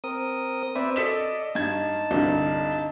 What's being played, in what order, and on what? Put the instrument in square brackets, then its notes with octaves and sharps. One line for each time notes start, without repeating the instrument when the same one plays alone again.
[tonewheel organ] C4 A#4 D#6
[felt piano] C4 [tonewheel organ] B4 D5 E5
[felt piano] A4 B6 E7 [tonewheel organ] D5 D#5
[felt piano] G2 G#6 [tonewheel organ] D#4 A5
[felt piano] C2 G2 D3